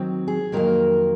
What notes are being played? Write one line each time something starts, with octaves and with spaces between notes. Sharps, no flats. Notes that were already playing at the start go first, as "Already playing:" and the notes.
Already playing: D#3 F#3 C4
G#4
F2 D#3 F#3 A#3 A#4